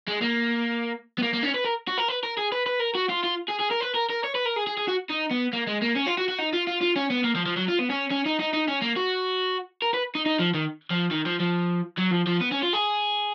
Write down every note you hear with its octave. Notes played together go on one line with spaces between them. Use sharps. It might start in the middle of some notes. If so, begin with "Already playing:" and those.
G#3
A#3
B3
A#3
A#3
C#4
B4
A#4
F#4
A#4
B4
A#4
G#4
B4
B4
A#4
F#4
F4
F4
G#4
G#4
A#4
B4
A#4
A#4
C#5
B4
A#4
G#4
G#4
G#4
F#4
D#4
B3
A#3
G#3
A#3
C#4
F4
F#4
F#4
D#4
F4
F4
F4
C#4
B3
A#3
F3
F3
F#3
F4
B3
C#4
C#4
D#4
D#4
D#4
C#4
A#3
F#4
A#4
B4
D#4
D#4
F3
D#3
F3
D#3
F3
F3
F#3
F3
F3
B3
C#4
F4
G#4